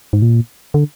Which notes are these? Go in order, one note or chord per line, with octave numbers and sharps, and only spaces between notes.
G#2
A#2
D3